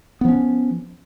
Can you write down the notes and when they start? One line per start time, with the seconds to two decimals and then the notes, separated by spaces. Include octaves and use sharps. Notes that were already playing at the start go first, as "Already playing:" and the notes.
0.21 B3
0.25 F3
0.28 C#4